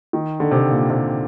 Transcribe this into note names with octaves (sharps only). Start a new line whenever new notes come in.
D#3
D3
C3
A#2
C3